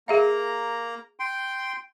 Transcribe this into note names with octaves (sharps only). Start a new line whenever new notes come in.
A#3 G#4 E5 F5 A#5
G5 C6